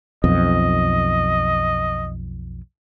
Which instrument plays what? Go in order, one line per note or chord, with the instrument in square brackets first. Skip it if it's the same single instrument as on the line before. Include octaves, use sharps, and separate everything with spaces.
[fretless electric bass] B1 F2 [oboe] D#5